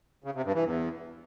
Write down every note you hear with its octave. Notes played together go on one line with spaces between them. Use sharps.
C#3
C3
G2
E3
E2